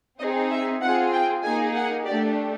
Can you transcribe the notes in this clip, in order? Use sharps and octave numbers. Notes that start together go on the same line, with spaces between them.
C4 D#4 G#4 D#5
E5
C4 F4 G#4 F#5
G5
A#3 D#4 G#4 G#5
F#5
A3 D4 G4 D5